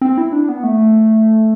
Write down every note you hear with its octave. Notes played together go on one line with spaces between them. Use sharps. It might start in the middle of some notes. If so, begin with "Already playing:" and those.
C4
E4
D4
B3
A3